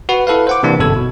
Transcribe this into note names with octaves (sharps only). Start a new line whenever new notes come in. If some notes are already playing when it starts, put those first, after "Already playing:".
F#4 B4 F#5
E4 A4 B4 F5
C5 F#5 D6
C3 E3 A#3 D4
G1 F#2 B2 A4 E6 G#6
B2